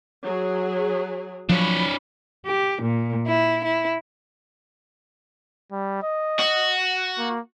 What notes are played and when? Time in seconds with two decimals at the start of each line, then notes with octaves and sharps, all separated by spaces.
0.24 F#3 G#4
1.49 F3 F#3 D4 C#5 B5
2.46 G4
2.83 A#2
3.26 E4
3.64 E4
5.71 G3
6.02 D#5
6.39 F#4
7.18 A#3